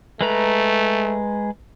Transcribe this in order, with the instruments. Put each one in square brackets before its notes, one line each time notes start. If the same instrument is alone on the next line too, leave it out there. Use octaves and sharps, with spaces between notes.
[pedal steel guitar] G#3 B4 A#5 [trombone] A3